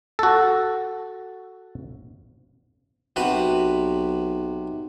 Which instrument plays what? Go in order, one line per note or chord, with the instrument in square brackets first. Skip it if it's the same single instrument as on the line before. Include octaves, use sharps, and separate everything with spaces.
[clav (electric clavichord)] F#4 A4
[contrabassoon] B1 [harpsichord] C3 F#4 B4